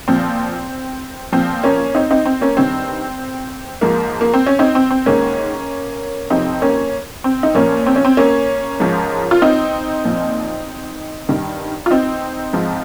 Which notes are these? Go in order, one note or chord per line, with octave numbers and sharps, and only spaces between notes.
A#2 F3 C4
A#2 F3 C4
A#3 C#4
C4 D#4
C4 D#4
C4
A#3 C#4
G2 D#3 C4
G#2 F3 A#3
A#3
C4
C#4
C4 D#4
C4
C4
G#2 D#3 A#3 C#4
F2 C3 F3 C4 D#4
A#3 C#4
C4
D#4
A#2 F3 A#3 C#4
C4
C#4
C4
A#3 C#4
G#2 F3
F4
C4 D#4
A#2 F3
G2 D#3
F4
C4 D#4
G#2 F3